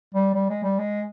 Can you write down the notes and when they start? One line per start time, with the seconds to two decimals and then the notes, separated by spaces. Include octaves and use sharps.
0.14 G3
0.35 G3
0.50 G#3
0.63 G3
0.79 G#3